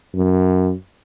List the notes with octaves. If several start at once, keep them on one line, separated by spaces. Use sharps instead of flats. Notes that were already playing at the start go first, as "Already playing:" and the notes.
F#2